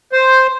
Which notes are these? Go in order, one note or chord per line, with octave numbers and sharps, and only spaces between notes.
C5